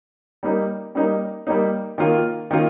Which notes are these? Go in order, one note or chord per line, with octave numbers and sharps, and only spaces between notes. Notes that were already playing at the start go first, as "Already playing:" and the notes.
G3 A#3 D#4
G3 A#3 D#4
G3 A#3 D#4
D#3 A#3 F4
D#3 A#3 F4